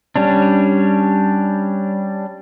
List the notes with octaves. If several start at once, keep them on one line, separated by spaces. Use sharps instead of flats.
G3 C#4 D4